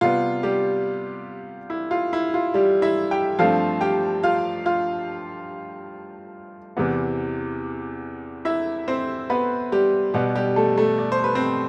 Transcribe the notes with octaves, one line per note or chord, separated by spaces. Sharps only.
C3 G3 B3 F4
G3 G4
E4
F4
E4
F4
G3 G4
E4 E5
G4 G5
G2 F3 A3 C4 F4 F5
G4 G5
F4 F5
F4 F5
E2 C3 E3 B3
E4 E5
C4 C5
B3 B4
G3 G4
B2 G3 B3 G4
G3 G4
A3 A4
A3 A4
D5
C5
B4
C4 C5